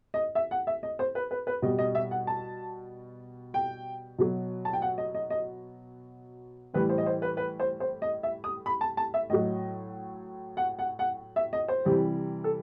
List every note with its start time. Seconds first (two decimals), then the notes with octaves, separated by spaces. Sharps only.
0.14 D#5
0.35 E5
0.51 F#5
0.67 E5
0.83 D#5
0.99 C5
1.15 B4
1.31 B4
1.47 B4
1.62 B2 G3 D#5
1.79 D#5
1.95 E5
2.11 F#5
2.27 A5
3.54 G5
4.18 B2 F#3
4.65 A5
4.73 G5
4.82 F#5
4.98 D#5
5.15 D#5
5.30 D#5
6.74 A2 E3 G3 B4
6.89 C5
6.98 D#5
7.06 C5
7.22 B4
7.37 B4
7.60 C5
7.80 C5
8.02 D#5
8.23 E5
8.44 D#6
8.66 B5
8.81 A5
8.97 A5
9.14 E5
9.30 A2 F#3 D#5
10.57 F#5
10.79 F#5
10.99 F#5
11.36 E5
11.53 D#5
11.68 C5
11.85 C3 E3 G3
12.44 A4